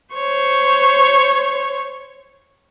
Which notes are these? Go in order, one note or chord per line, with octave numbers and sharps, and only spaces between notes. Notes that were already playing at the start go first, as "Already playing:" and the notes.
C5 C#5